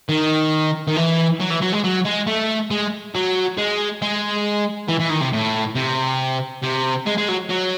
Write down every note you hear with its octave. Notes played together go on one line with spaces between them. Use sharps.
D#3
D#3
E3
F#3
E3
F#3
G#3
F#3
G#3
A3
G#3
F#3
G#3
G#3
E3
E3
D#3
C3
A2
C3
C3
G#3
G#3
F#3
F#3